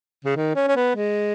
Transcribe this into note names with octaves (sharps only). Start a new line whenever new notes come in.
C#3
D#3
C#4
C#4
B3
G#3